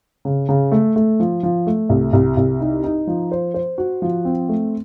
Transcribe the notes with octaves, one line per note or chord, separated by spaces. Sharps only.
C#3
C#3
A3
A3
F3
F3
A3
C2
C2
C2
D#4
D#4
F3
C5
C5
F#4
F3
C4
A3